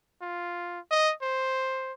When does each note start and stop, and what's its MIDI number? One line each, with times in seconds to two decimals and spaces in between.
0.22 0.80 65
0.91 1.13 75
1.22 1.93 72